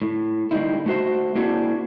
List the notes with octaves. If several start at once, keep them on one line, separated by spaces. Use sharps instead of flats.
A2
A2 D3 G3 A#3 D#4 E4
A3 F#4 C5 E5
A#3 C4 D4 E4 F#4 G#4